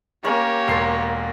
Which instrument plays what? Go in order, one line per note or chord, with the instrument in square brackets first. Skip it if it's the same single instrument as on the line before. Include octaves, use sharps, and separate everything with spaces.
[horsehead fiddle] A#3 [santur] C#4 A#4 C#6 [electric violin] G4 C#5
[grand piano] E1 C6 C7 [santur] A4 A#4